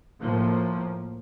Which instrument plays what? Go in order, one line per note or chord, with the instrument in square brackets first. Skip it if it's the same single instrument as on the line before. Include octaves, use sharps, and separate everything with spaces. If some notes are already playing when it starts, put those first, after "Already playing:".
[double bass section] A2 F3 A#3